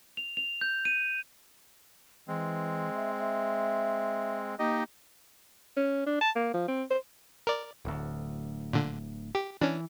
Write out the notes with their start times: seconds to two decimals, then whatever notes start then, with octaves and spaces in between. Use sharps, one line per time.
0.17 F7
0.37 F7
0.61 G6
0.85 D#7
2.28 E3 G#3 C4
2.95 E5
3.20 E5
4.59 A#3 D#4 G4 D#5
5.77 C#4
6.07 D4
6.21 A5
6.36 A#3
6.54 F3
6.68 C4
6.90 C5
7.47 A#4 D5
7.85 D1 D2
8.73 A#2 D3
9.35 G4
9.61 E3 C#4 D4